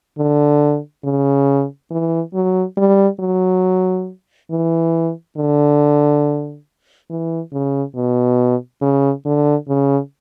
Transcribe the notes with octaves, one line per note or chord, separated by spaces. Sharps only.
D3
C#3
E3
F#3
G3
F#3
E3
D3
E3
C#3
B2
C#3
D3
C#3